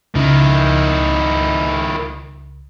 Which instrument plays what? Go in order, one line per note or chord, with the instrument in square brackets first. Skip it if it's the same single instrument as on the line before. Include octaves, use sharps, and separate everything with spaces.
[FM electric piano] C#2 [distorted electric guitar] D#3 E4